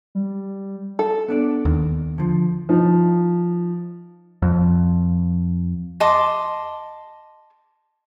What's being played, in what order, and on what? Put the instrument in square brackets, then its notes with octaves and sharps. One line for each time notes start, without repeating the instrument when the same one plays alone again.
[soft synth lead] G3
[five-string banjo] A4
[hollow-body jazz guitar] B3 D4 D5
[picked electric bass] D#2
[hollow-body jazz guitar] D3 F3
[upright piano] F3 D#4
[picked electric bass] F2
[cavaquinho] D#5 A5 C6 D6